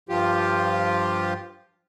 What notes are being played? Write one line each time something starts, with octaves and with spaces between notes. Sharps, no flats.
G2 F3 F4 G4